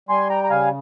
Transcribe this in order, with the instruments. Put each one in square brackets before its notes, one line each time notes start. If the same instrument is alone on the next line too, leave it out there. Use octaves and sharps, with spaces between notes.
[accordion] G3 G#5 C6
G5 A#5
A#5
C#3 F5 G#5